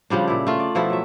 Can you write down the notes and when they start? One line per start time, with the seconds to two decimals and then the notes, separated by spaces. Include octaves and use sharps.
0.10 C#3 F3 G3 D4
0.28 A#2 E4
0.47 A3 F4
0.60 D5
0.75 B2 F3 E4 A4
0.90 F#3 E5